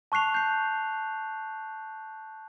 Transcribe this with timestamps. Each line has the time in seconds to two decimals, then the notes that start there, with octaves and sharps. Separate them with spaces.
0.12 A5 C#6 F#6 C7 F7
0.34 G6 C7